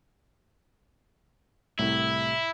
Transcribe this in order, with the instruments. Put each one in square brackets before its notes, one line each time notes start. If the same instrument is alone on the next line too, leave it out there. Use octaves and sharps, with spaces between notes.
[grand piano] C2 A2 C3 [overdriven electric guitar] E4